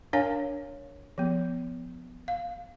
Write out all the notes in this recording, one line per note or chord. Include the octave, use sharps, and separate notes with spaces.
D4 A#4 C#5 F5 G#5
F3 B3
F5